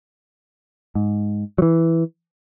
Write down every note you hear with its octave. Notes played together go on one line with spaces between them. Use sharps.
G#2
F#3
E3